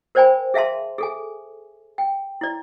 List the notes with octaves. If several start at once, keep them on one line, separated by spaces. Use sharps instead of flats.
A#4 C5 D5 G5 G#5 B5
G#4 E5 F5 A5 C6
G#4 A4 G#5
G5
E4 D5